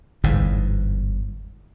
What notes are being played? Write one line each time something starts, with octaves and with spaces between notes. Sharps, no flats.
G1 E2 G#2